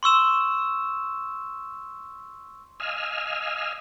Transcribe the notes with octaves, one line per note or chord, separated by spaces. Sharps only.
C6 C#6 E6 E7
D#5 F5 G#5 E6 F6